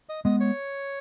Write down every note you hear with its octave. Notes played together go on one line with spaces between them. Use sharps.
D#5
G#3 B3 D#5
C#5